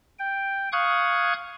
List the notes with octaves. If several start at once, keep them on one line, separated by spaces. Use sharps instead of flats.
G5
F5 C#6 D#6 F#6 G#6